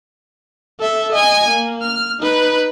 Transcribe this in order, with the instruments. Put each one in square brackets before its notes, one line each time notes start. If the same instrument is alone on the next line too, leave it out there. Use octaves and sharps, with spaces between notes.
[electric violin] A4 E5
D#5 G#5
A#3
F6
D#4 B4